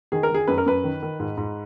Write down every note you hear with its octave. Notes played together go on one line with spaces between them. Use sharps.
D#3 G#4
A#4
D#3 G#4
F#2 B4
A#4
F#2 B4
D#3
D#3
G#2
G#2